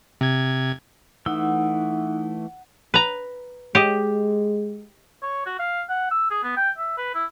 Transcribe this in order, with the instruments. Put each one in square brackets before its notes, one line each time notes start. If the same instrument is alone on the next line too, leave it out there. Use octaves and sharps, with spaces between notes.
[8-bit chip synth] C3 G#6
[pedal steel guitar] E3 A3 E6 [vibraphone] D#4 [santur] F#5
[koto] B4 A#5
[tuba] G#3 [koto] G4 D#5
[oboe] C#5
F#4
F5
F#5
E6
G#4
B3
G5
E5
B4
E4